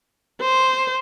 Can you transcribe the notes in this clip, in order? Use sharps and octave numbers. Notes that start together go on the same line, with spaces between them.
C5